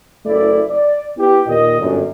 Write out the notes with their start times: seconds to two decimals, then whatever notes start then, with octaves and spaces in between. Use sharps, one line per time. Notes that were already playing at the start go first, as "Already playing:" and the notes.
0.25 F#1 A3 E4 D5
0.69 D5
1.18 B3 E4 G4
1.48 D#2 A#2 D#5
1.79 G1 F#2